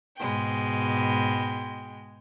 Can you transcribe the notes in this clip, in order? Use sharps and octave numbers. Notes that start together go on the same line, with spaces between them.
G#2 B2 G#3 G5